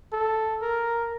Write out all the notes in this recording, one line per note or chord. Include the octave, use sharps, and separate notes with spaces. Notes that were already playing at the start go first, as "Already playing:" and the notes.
A4
A#4